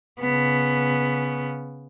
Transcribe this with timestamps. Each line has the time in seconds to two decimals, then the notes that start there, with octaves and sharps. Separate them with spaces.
0.21 C#3 B3